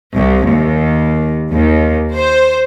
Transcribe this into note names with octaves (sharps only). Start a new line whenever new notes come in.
C2
D#2
D#2
C5